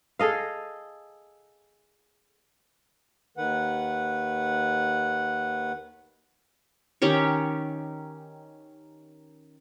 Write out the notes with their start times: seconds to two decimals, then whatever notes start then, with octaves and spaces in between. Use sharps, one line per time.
0.19 G#4 A4 D#5 F5
3.37 D#2 D#3 B4 F#5
7.02 D#3 C#4 G4 C#5